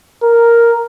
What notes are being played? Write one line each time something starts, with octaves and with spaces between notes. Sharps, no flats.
A#4